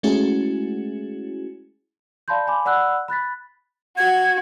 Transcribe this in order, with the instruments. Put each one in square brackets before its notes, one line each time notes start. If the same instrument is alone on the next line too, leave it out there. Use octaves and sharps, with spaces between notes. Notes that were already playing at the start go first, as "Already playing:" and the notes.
[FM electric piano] G#3 A3 C#4 E4 F#4 G#4
[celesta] D5 F5 A5 B5 C6 G6
G#5 B5 D6
D5 F#5 B5 E6 F#6
B5 F#6 A6 B6
[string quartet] F#4 [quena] G#6